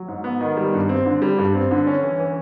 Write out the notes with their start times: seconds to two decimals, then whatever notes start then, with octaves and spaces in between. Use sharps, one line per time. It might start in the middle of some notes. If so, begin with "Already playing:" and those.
Already playing: F#3
0.08 G#2
0.24 B3
0.41 D#3
0.57 G3
0.73 G2
0.89 C4
1.06 D3
1.22 G3
1.38 G2
1.55 C4
1.71 D3
1.87 C#4
2.03 E3
2.19 E3